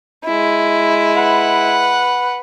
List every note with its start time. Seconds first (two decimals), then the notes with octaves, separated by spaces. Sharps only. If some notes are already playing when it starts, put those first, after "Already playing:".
0.25 G#3 E4
1.17 B4 F#5